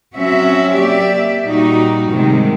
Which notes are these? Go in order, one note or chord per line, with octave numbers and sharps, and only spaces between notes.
F#3 C4 C#4 F#4 E5
A#3 G4 D5 E5
A#2 G3 D#4 F#4
G#2 C3 D#3 G3 G#3